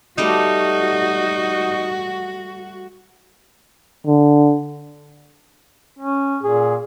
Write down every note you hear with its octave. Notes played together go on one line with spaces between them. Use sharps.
G3 A3 D#4 F#4
D3
C#4
A#2 G#4